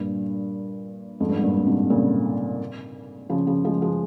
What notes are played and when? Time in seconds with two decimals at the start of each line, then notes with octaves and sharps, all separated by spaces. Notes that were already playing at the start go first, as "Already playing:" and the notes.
Already playing: G2 A#2
1.20 F2 G#2
1.29 G2
1.36 G#2
1.44 G2 A#2
1.55 A#2
1.67 G#2 C3
1.90 A#2 C#3
3.30 C#3 F3
3.47 C#3 F3
3.65 F3 G#3
3.82 F3 G#3